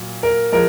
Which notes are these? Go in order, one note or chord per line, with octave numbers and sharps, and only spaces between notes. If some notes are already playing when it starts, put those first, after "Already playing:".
Already playing: A#2 F#3
A#4
F3 G#3 A#4